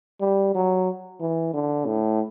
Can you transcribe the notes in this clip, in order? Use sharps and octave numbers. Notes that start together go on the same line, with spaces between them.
G3
F#3
E3
D3
A2